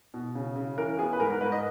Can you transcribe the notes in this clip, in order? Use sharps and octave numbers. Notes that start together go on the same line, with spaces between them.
B2
C#3
C#3
E3 A#4
B3 G#4
B4
G#2 A#4
A#4
G#2 B4
D#5